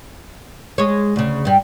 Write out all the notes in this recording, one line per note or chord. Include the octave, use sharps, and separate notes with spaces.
G#3 C#5
D2 C#3
G2 G3